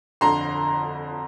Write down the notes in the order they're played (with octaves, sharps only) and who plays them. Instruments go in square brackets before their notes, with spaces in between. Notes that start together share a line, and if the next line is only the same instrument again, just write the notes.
[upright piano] G1 F2 D3 A#5 C6